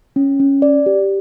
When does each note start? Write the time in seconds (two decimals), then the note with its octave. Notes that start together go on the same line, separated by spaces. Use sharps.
0.16 C#4
0.40 C#4
0.62 D5
0.86 G4